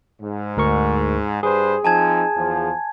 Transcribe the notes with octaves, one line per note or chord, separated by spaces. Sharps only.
G#2
D2 A#4 C#6
G2 G#4 B4 C5
F3 C4 D#4 G#5 A5 G#6
E2 F3